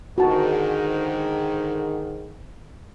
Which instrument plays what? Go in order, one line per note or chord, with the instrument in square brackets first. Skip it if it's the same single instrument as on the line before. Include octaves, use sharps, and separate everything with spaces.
[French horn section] G#2 D3 D#3 [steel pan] F#4 A5